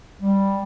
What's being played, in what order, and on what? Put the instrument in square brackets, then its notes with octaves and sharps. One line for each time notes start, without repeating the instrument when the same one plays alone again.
[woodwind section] G3